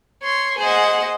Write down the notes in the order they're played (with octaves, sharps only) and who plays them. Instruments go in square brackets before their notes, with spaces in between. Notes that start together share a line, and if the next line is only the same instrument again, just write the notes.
[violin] C#5 C6
[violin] G#4 F#5 [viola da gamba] C5 D#5